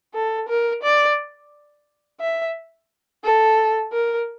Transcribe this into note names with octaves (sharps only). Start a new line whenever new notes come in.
A4
A#4
D5
E5
A4
A#4